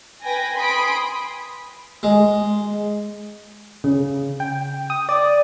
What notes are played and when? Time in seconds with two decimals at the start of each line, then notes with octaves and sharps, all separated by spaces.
0.23 B4 G5 G#5 A#6
0.56 G#5 B5 C6 D#6 B6 D7
2.03 G#3
3.84 C#3
4.40 G5
4.90 D#6
5.09 D5